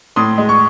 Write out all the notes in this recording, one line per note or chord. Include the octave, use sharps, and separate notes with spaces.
A2 C6 D#6
G#3
C#6